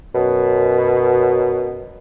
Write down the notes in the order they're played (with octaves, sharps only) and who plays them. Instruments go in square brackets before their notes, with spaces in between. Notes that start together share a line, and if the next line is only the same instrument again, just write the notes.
[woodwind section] F#2 B2